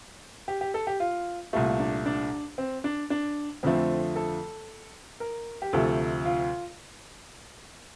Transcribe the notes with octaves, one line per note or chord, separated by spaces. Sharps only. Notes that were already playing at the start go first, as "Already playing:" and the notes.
G4
G4
A4
G4
F4
C2 A#2 A3 F4
D4
D4
C4
D4
D4
F2 D3 F3 A3 C4
A4
A#4
G4
D2 C3 F3 A3 A4
F4